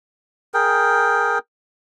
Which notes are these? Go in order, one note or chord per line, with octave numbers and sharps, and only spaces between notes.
G#4 A#4 G5